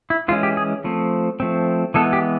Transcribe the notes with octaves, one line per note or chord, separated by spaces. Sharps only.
E4
E3 G#3 C#4 F4
G4
G#4
F3 A3 C4
F3 A3 C4
E3 G#3 B3 A4
G4